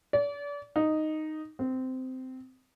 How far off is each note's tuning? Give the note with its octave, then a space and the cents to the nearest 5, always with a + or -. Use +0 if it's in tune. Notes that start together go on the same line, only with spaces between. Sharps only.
D5 -35
D#4 -5
C4 -15